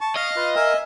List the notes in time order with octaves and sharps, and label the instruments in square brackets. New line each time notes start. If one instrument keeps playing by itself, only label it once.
[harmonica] A5 [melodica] C#6
[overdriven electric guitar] D#5 [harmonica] F5
[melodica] F4 B4
[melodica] A#4 F5 [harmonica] E5 G#5